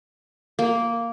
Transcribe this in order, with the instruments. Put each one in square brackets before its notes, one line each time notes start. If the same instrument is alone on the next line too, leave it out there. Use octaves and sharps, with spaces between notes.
[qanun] A#3